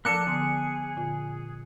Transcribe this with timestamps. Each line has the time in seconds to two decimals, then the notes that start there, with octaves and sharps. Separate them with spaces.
0.05 F3 A#3 D4 A4 D5 F#6 C#7
0.27 D3 B3 G#4 C6
0.97 A#2 D3 F4